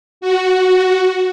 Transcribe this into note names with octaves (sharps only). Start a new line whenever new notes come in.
F#4